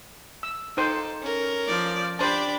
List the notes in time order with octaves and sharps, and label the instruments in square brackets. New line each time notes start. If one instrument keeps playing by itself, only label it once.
[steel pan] E6
[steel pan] D#4 C5 G5 [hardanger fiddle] A4
[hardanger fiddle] C#4 A#4
[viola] F3 D5
[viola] D4 B5 [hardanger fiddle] G4 D5 [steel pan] C5 A5